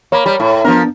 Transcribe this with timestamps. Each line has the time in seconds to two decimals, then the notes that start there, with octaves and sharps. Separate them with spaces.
0.12 A#3 C#5 B5
0.26 G3
0.40 A2
0.65 F3 B3 D4 A#4